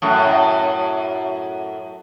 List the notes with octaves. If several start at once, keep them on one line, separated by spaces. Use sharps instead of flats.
F#2 A2